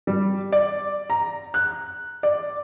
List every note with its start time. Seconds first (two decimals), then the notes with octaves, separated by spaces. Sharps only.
0.07 G3
0.52 D5
1.10 A#5
1.54 F#6
2.23 D5